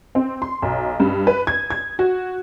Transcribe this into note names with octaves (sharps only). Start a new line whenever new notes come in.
C4
C6
B1
G2
B4
G#6
G#6
F#4